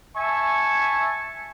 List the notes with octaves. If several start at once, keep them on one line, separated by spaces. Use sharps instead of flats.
E5 G#5 A5 C#6